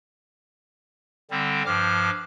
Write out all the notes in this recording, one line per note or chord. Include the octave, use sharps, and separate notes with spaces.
D3 G3 C4
G2 F3 D6 F6